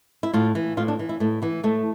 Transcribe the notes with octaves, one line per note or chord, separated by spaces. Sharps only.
E4
A2 F4
E3
A2 F4
D4
E3
E4
A2 A3
E3 B3
A2 A3